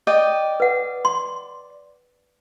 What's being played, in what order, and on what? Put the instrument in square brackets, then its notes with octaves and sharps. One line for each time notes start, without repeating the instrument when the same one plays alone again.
[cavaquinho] D5 D#5 G5
[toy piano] B4 F#5
C6